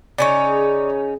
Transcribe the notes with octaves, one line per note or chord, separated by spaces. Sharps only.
C#3 C#4 D#4 D5 C#6